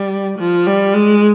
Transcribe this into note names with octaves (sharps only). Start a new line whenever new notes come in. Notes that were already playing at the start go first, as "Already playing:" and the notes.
Already playing: G3
F3
G3
G#3